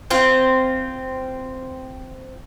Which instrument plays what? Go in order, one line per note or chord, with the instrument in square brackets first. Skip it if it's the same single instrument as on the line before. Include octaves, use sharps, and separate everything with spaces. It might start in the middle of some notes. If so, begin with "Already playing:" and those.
[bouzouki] C4 F4 C5